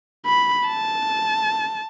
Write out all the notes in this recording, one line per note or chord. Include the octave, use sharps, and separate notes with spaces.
B5
A5